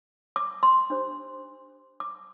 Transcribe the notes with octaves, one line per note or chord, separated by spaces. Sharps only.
D6
C6
D4 G4 C5
D6